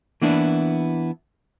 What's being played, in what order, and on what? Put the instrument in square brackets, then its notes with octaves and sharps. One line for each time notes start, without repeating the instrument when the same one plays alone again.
[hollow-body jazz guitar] E3 A#3 B3 D4 E4